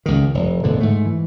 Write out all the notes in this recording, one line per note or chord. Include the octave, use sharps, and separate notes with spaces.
C#2 D#3
F1
E1 A2 D3
G#2 A3
E3